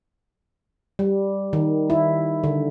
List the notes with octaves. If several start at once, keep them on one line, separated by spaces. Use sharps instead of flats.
G3
D#3
E4
D3